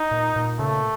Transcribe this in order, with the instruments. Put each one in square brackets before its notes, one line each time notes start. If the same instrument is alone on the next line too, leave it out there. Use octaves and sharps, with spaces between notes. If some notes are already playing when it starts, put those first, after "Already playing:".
Already playing: [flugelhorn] D#4
[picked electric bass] A#2
A#2
[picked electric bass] C#3 [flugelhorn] A3